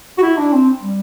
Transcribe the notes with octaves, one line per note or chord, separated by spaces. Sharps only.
F#4
E4
D4
C4
G3